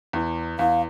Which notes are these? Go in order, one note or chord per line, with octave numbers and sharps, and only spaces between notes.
E2
E2 F5